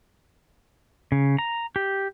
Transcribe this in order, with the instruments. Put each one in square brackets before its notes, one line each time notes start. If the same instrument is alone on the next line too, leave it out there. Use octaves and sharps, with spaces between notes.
[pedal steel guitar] C#3
A#5
G4